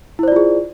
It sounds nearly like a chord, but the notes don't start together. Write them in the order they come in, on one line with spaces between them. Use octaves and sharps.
E4 C5 D5 F4 G#4